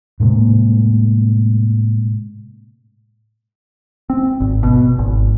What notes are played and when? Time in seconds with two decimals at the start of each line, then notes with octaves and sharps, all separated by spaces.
0.20 A2 C3 G#3 A#3
4.10 C4
4.40 G#1
4.63 B2
4.99 G#1